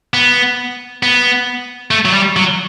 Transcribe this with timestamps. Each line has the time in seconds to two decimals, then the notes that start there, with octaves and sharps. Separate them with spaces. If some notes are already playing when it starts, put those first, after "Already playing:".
0.14 B3
1.03 B3
1.91 A3
2.05 F#3
2.13 G3
2.36 F#3